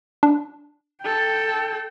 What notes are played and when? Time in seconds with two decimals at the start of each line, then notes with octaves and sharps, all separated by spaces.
0.23 D4
1.02 A4 G5